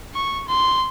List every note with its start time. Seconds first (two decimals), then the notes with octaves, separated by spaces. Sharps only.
0.15 C#6
0.49 C6